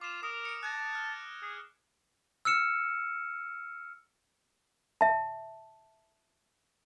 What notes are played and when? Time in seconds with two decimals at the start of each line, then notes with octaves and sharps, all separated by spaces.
0.01 F4 D6 E7
0.23 A#4 D#6
0.45 C#7 D7
0.63 A5 F#6 G#6 A#6
0.93 F6 F#6
1.43 G#4
2.45 E6 F6 C#7 E7
5.01 E5 A5